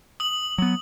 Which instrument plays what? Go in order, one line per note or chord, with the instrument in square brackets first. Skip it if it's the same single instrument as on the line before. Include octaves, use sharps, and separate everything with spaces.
[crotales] D#6 F#7
[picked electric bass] F#3 B3